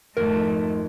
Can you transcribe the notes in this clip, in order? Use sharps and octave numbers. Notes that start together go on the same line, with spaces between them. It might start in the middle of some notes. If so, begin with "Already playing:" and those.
G#1 F2 A3 A#4